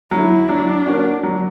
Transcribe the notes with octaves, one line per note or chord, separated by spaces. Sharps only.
D3 F#3 E4
F#3 D4
A#3 C#4 F#4
F#3